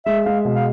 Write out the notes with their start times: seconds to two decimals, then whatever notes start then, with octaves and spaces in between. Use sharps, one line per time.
0.06 G#3 E5
0.25 G#3 F5
0.45 B2
0.55 F5